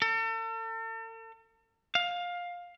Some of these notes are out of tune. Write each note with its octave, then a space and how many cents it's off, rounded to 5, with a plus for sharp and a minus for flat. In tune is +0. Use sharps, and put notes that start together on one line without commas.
A4 +40
F5 +15